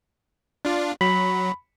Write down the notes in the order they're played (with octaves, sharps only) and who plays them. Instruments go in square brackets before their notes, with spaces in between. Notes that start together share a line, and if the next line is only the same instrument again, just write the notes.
[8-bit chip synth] D4 F4
[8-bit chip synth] F#3 [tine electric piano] B5